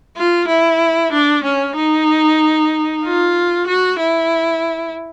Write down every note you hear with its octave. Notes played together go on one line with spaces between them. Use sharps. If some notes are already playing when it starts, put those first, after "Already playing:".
F4
E4
D4
C#4
D#4
F4
F#4
E4